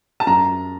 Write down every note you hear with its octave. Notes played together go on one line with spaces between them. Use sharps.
A5
F#2 A#5